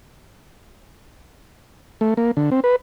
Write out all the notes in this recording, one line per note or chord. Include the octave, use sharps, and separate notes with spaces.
A3
A#3
D3
C4
B4